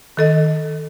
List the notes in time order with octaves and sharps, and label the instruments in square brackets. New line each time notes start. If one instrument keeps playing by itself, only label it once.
[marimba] D#3 A4 D#5